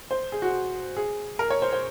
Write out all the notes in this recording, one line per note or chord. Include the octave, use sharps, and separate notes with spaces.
C5
G#4
F#4
G#4
A#4
C#5
C5
C5